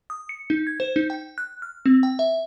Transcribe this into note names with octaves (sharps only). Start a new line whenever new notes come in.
D#6
C#7
D#4
G#6
C5
D#4
G5
F#6
F6
C4
G5
E5